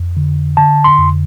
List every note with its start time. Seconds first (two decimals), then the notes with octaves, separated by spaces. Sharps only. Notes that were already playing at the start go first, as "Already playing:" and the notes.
Already playing: F2
0.17 D3
0.57 D3 A5
0.84 C6
0.98 F2